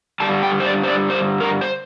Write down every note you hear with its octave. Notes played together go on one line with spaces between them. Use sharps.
G2 D3 G3 A5
G5
C5
D5
C5
D5
C5
A#4
C5